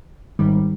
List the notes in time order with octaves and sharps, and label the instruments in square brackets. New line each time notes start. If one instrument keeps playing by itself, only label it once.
[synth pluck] G#1 G#2 D#3 G3